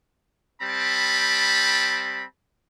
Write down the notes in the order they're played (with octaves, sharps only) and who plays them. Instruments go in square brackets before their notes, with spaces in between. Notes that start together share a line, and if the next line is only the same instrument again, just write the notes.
[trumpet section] G3 C4 A5 B5